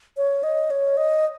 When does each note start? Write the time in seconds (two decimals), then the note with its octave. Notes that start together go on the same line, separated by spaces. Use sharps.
0.17 C#5
0.43 D#5
0.70 C#5
0.97 D#5